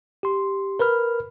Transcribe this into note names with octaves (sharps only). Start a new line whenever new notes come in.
G4 C6
A#4 B4 B5 F6